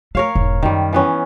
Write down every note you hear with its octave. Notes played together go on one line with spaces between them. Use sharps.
A3 A#4 C#5 F5
E1 G#2
F#2 D#3 G3
E3 B3 C#4